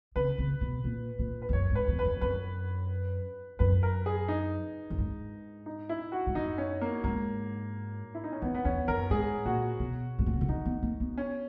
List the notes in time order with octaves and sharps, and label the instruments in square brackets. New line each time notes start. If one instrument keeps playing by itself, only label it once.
[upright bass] C#3 [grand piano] B4
[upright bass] C#3
B2
A#2
A#2
[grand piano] B4
[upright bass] E2
[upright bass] F#2 [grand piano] C#5
[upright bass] G#2
[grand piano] B4
[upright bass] E2
[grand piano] B4
[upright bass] F#2
[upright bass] F#2 [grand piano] B4
[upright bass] F#2 [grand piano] B4
[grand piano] A#4
G#4
D#4
[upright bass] F#2
G#2
[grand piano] D#4
E4
F#4
[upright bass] G#2
[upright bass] F#2 [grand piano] D#4
[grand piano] C#4
A#3
[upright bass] G#2 [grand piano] A#3
[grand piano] E4
D#4
C#4
[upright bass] E2 [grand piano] B3
[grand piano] B3
[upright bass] E2 [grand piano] C#4
[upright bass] F#2 [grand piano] A#4
[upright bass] G#2 [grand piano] G#4
[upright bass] A#2 [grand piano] F#4
[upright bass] B2
G#2
A#2
B2
C#3
[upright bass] D#3 [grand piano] D#4
[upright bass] B3
A#3
B3
[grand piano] C#4